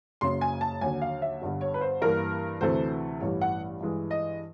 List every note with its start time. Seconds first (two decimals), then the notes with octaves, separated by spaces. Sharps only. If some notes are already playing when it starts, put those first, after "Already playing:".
0.21 F#1 F#2 C#3 C6
0.41 G#5
0.61 A5
0.81 D#2 D3 F#3 G#5
1.02 F5
1.22 E5
1.42 G1 G2 D3 G3
1.61 C#5
1.74 B4
1.81 C5
2.02 G2 E3 G3 A#3 A#4
2.61 D2 C3 E3 A3 C5
3.20 A1 G2 E3 G3 C#5
3.41 F#5
3.81 G2 E3 G#3
4.11 D#5